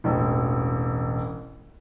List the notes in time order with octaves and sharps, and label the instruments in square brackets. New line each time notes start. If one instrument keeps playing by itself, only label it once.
[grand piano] E1 A1